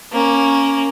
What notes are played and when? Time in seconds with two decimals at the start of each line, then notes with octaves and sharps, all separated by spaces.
0.12 A#3 C#4